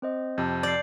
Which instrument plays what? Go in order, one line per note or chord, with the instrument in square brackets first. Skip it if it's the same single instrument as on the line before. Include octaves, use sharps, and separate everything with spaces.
[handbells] C4 C5 D#5
[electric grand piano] F2 C3 [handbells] A5 G6
[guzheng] D5 [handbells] G6 C7